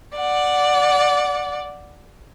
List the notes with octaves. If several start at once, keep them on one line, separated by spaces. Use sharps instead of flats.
D5 F#5